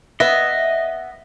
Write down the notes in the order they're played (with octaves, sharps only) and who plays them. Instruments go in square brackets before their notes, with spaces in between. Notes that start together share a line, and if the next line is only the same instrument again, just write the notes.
[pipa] B3 [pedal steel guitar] D#5 [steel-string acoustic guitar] E5